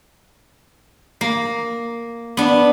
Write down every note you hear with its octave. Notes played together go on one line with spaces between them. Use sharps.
A#3
B3 D4